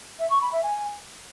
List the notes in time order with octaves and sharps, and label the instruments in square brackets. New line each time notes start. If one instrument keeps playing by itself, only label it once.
[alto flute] E5
C#6
B5
E5
G#5